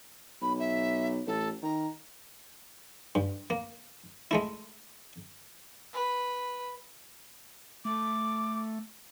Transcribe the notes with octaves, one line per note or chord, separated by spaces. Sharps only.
B1 B5
E5
A1 A4
D#3 A#5
G2
A#3
G#3 A3 E4
B4
A3 D6